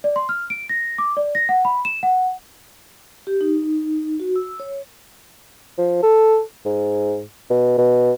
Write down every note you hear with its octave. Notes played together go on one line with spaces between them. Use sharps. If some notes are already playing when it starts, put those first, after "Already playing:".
D5
C6
F6
D7
A#6
D6
D5
A#6
F#5
B5
E7
F#5
G4
D#4
F#4
E6
C#5
F3
A4
G#2
B2
B2